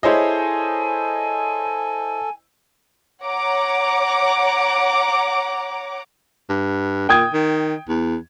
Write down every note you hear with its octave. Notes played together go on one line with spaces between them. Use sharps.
E4 G#4 A4 C5 C#5 D#5 G#5
C#5 F#5 A#5 D6
G2
A#2 G5 D#6 G#6
D#3
E2